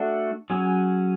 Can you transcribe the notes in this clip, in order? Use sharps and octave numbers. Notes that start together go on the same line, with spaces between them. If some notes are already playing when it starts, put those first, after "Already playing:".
Already playing: A3 D4 F#4
F#3 C#4 G#4